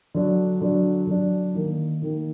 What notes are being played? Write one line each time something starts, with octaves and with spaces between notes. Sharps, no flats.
D3 F#3 D4
D3 F#3 D4
D3 F#3 D4
D#3 A#3 D#4
D#3 A#3 D#4